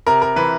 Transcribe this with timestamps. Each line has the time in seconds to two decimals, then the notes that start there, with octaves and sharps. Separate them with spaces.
0.07 C3 A#4
0.22 A#4
0.36 E3 B4